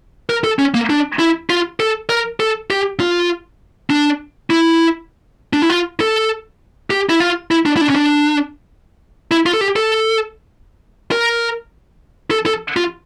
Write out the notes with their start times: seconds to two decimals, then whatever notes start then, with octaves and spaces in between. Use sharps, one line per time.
0.30 A#4
0.44 A4
0.59 C#4
0.75 A#3
0.90 D4
1.19 E4
1.50 F4
1.80 A4
2.09 A#4
2.40 A4
2.70 G4
3.00 F4
3.90 D4
4.50 E4
5.53 D4
5.62 E4
5.70 F4
6.00 A4
6.90 G4
7.09 E4
7.20 F4
7.51 E4
7.66 D4
7.77 E4
7.81 D4
7.90 C#4
7.96 D4
9.31 E4
9.46 F4
9.54 A4
9.61 G4
9.76 A4
11.12 A#4
12.31 A4
12.46 A4
12.77 F4